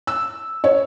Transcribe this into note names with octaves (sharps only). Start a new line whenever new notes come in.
E6
C#5